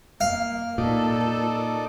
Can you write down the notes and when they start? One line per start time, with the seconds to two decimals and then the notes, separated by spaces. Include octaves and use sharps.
0.21 A#3 F5
0.78 A#2 D#4 A4 D5